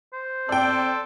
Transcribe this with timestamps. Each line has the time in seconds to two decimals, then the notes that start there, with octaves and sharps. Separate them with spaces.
0.13 C5
0.49 C4 A4 D5 G5